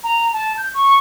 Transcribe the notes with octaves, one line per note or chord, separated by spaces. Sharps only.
A#5
A5
G6
C#6